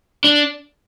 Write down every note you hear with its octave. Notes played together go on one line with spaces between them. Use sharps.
D4